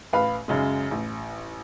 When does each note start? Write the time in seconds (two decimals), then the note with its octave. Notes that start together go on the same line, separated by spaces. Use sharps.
0.13 A1 B4 F5 B5
0.48 F#2 C#3 G#3
0.91 A1